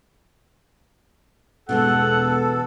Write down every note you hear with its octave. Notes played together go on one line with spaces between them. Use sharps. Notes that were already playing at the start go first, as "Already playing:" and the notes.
E1 B2 E3 G#3 A4 F#5